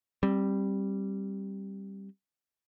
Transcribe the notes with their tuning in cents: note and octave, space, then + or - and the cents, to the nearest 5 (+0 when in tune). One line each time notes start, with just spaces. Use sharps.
G3 +0 C4 +30